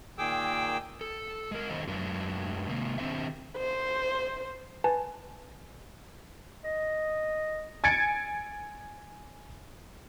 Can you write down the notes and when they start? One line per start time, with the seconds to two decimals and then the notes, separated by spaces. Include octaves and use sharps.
0.18 A#2 D#3 G#4 G5 D6 E6
1.01 A4
1.51 G#3 A#4
1.69 D#3 C#4 A4 C5 D5 D#5
1.87 F#2 F#3 G#3 A3 D4 B4
2.69 C3 D#3 G#3 A#3
2.98 D#3 C4 D4 C5 E5
3.57 C5
4.84 B4 G#5 A5
6.65 D#5
7.84 G#5 G#6 A6 C#7 D7